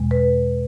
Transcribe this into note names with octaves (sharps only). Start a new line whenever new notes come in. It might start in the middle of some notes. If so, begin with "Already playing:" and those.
Already playing: E2 B2 G#3
B4